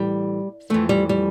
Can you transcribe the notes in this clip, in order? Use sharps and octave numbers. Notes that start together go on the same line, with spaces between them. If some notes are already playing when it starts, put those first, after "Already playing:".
Already playing: A2 E3 G3
F2 E3 A3
G3
G3